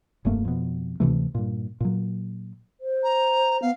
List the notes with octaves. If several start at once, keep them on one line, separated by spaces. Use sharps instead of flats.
F1 G2 A3 A#3
F2 B2
D2 C3 E3 A3
G2 A#2
A#2 F#3
C5
A#5
B3 F5